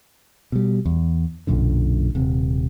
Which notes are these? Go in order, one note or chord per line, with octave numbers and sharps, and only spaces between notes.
B2 G3
E2
B1 F#2 A#2 D3
D#1 C3